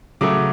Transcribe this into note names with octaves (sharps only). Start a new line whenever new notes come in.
C#3 F#3 A3 D6